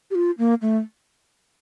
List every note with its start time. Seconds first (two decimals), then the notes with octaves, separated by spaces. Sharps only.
0.11 G4
0.15 F4
0.38 A#3
0.62 A3